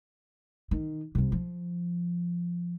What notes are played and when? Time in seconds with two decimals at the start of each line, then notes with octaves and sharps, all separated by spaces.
0.71 D#3
1.15 C2 C3
1.32 F3